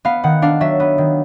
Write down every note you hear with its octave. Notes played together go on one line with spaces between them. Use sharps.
B3 F5
D#3 F#5
D4 F5
F#3 E5
B3
D#3